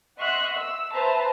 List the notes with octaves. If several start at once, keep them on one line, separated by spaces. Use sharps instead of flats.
D#5 E5 F#5 C6 C#6 F#6
E6
B4 C5 E5 A5 A#5